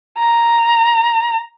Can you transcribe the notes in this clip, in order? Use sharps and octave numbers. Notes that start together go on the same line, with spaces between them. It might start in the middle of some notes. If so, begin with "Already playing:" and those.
A#5